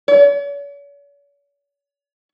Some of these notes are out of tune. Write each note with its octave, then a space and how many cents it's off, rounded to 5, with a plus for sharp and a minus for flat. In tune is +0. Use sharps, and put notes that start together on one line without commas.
C#5 +45